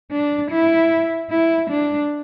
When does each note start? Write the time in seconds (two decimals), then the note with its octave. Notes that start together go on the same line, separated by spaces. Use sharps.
0.11 D4
0.51 E4
1.31 E4
1.71 D4